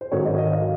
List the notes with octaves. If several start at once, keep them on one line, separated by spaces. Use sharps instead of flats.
C5
G#2 D#3 F#3 C#5
D#5
D#5
F5